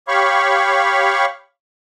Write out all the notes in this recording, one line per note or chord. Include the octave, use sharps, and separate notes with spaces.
G4 C#5 F5 B5 C#6